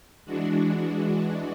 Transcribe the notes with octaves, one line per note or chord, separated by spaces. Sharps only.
E3 G#3 D4 F#4